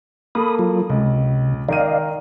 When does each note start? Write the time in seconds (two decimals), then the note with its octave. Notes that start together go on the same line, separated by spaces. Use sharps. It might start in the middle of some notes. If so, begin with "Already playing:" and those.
0.35 A#3 A4 B5 D#6
0.59 F#3 F4
0.90 C#2 C3
1.69 D#3 A#4 D5 D#5 F5 D#7